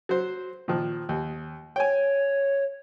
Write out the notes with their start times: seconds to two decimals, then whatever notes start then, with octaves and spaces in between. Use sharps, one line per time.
0.09 F#3 C5
0.68 A#2 D#3 F3
1.09 D#2
1.76 C#5 G5 G#5